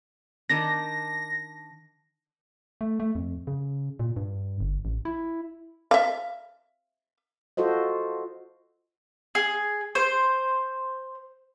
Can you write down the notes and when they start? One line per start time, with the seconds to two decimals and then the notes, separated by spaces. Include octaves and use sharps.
0.50 D#3 D4 A#6
2.81 A3
3.00 A3
3.15 F2
3.47 C#3
3.99 A#2
4.16 G2
4.60 G1
4.85 A1
5.05 E4
5.91 E5 F5
7.57 F4 F#4 A4 C5 D#5
9.35 G#4
9.95 C5